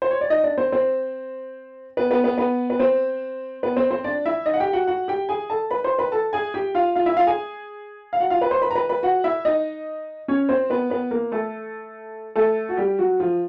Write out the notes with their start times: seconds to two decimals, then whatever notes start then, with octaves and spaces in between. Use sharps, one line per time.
0.02 C5
0.11 C#5
0.21 D5
0.30 D#4 D#5
0.44 D4 D5
0.58 C4 C5
0.72 C4 C5
1.97 B3 B4
2.11 B3 B4
2.24 B3 B4
2.38 B3 B4
2.70 B4
2.79 C4 C5
3.63 B3 B4
3.76 C4 C5
3.91 C4 C5
4.04 D4 D5
4.26 E4 E5
4.46 D#4 D#5
4.54 F#5
4.60 G4 G5
4.73 F#4 F#5
4.87 F#4 F#5
5.08 G4 G5
5.29 G#4 G#5
5.50 A4 A5
5.71 B4 B5
5.84 C5 C6
5.99 B4 B5
6.12 A4 A5
6.33 G#4 G#5
6.54 G4 G5
6.75 F4 F5
6.95 F4 F5
7.06 E4 E5
7.16 F4 F5
7.27 G#4 G#5
8.13 F5
8.20 F#4 F#5
8.30 F4 F5
8.41 B4 B5
8.51 C5 C6
8.62 B4 B5
8.71 A#5
8.75 B4 B5
8.89 B4 B5
9.03 F#4 F#5
9.24 E4 E5
9.45 D#4 D#5
10.28 C#4 C#5
10.49 C4 C5
10.70 B3 B4
10.90 B3 B4
11.11 A#3 A#4
11.32 A3 A4
12.36 A3 A4
12.69 F#4
12.77 G3 G4
12.99 F#3 F#4
13.20 F3 F4